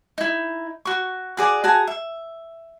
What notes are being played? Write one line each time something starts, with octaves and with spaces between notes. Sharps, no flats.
D#4 E4
F#4 C#6
F#4 G#4 D5
F#4 G#4 A5 A#5
E5